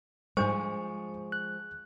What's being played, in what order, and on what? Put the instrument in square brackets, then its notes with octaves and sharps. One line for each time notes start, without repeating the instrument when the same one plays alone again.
[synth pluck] G#2 G3 [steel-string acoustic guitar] F3 G#3 [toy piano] D4 C5 [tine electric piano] C#6
[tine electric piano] F#6